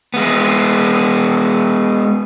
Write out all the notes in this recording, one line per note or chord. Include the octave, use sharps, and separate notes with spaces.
G#3 B3